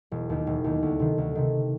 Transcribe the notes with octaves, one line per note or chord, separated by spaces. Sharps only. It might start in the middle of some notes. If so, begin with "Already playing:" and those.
E1
D#2 D#3
E1
D#2 D#3
D2
C3 D#3
D2
C3 D#3